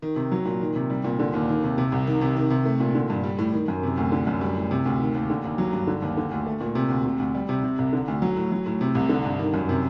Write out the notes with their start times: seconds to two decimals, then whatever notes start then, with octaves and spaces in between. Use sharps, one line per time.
0.02 D#3
0.16 C3
0.32 F#3
0.45 A#2
0.61 D#3
0.76 C3
0.90 G3
1.04 A#2
1.19 D3
1.34 D#2
1.49 D#3
1.63 C3
1.78 C3
1.92 C2
2.07 D#3
2.21 C3
2.37 D#3
2.50 C3
2.66 A3
2.80 A#2
2.95 D3
3.10 G2
3.24 G3
3.39 A2
3.53 D#3
3.68 F#2
3.83 C3
3.97 D2
4.12 D3
4.27 F#2
4.41 G3
4.56 A2
4.71 C3
4.86 D2
4.99 D#3
5.15 D#2
5.30 D3
5.44 D#2
5.58 F#3
5.73 G2
5.87 D3
6.02 D#2
6.17 D3
6.31 D2
6.46 A3
6.61 A#2
6.75 C3
6.90 D2
7.05 C3
7.19 D2
7.35 G3
7.49 C3
7.64 C3
7.78 C2
7.93 D3
8.08 D2
8.22 F#3
8.37 A2
8.52 F#3
8.66 A2
8.81 C3
8.95 C2
9.09 D3
9.25 G2
9.39 D#3
9.54 F#2
9.69 C3